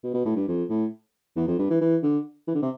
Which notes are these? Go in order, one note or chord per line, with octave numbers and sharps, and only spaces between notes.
B2
B2
A2
G2
F2
A2
E2
F2
G2
E3
E3
D3
E3
D3
C3